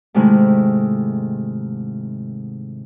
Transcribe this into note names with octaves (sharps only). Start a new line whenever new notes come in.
G#2 C3 D#3 G#3 A3 E4